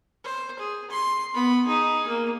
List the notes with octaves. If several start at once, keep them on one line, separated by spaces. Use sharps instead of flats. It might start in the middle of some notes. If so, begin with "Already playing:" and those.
C5
G#4
C6
B3 B5
D#4 G#4
A#3